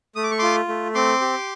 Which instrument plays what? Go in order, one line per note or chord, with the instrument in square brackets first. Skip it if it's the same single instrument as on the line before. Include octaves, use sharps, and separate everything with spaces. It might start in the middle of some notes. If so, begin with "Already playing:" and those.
[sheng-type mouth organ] A3 D#6
D6
C#6
F4 C6 D6
A3
C4 C6 D6
G4